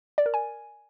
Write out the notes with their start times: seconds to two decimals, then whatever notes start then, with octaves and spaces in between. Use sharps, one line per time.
0.18 D5
0.26 A#4
0.34 G#5